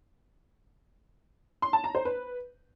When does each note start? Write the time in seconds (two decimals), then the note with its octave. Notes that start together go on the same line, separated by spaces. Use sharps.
1.62 C6
1.73 A5
1.84 A#5
1.95 C5
2.05 B4